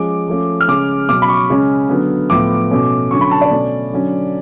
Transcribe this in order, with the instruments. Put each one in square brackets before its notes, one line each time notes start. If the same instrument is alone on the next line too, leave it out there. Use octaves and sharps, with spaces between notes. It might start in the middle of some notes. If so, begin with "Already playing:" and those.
Already playing: [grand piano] F3 G#3 C#4 D6
F3 A3 C#4
F6
C#3 G#3 C#4 D6
B2 F#3 C#4 D6
B5
C#6
C#3 G#3 C#4
D3 F#3 B3
A2 F3 B3 D6
B2 A3 C#4
D3 F#3 C#4 C#6
B5
A5
D5
B2 A3 C#4
D3 F#3 C#4